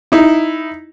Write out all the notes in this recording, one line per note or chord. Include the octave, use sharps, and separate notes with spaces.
D#4 E4